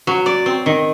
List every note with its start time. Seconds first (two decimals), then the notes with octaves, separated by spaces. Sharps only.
0.07 F#3
0.26 D5
0.46 C4
0.66 D#3